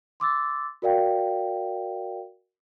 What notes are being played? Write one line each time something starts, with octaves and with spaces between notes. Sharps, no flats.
C6 D6 E6 A6
F#4 A#4 D5 F5 G5